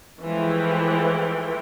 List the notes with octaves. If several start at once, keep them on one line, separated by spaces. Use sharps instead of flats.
E3 F3 G#3 A3 E4 G5